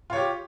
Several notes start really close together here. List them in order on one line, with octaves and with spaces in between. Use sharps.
F4 C#5 G4